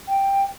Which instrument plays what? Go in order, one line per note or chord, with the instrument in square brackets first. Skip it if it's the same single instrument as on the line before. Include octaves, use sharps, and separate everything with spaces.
[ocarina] G5